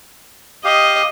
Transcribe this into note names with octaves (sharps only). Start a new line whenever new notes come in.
G4 D#5 F5